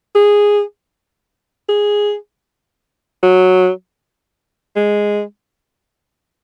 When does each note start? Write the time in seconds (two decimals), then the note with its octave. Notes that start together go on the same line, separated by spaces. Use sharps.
0.15 G#4
1.68 G#4
3.23 F#3
4.76 G#3